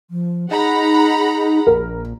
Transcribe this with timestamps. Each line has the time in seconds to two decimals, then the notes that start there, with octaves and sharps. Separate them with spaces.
0.11 F3
0.51 D#4 G#4 F#5 A#5 B5
1.67 A#1 A#4